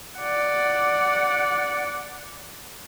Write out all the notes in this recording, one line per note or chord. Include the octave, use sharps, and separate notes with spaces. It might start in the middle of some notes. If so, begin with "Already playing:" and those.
D5 F#5